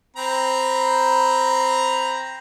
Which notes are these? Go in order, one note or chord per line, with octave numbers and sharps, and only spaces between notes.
C4 A#5 B5